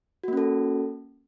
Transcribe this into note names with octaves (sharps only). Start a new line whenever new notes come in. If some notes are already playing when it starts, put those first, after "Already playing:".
A#3 C#4 F#4 A4